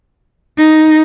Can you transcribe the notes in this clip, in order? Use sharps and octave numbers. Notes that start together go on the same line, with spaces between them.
D#4